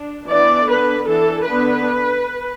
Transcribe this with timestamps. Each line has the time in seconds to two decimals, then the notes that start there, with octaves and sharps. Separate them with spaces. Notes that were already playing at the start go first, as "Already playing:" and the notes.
Already playing: D4
0.28 E3 B3 D4 D5
0.67 D3 B3 D4 B4
1.07 E3 D4 A4
1.47 D3 B3 D4 B4